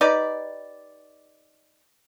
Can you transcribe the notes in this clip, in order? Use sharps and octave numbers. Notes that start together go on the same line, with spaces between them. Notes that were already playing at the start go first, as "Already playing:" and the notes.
D#4 G4 B4 D5